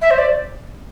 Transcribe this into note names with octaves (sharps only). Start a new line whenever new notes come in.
E5
C5
D5